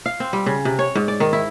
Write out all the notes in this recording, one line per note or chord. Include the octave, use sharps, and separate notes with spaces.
F5
C4
G3
C#3
C3
C#5
G#2
D5
D#3
E4